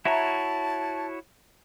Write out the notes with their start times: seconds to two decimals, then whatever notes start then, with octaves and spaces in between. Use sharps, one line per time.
0.05 E4 F#4 C#5 E5 A5 A#5